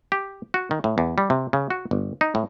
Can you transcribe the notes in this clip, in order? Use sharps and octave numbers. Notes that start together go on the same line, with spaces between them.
G4
F#4
D#3
A2
E2
G3
C3
C#3
F#4
G1
D#4
A2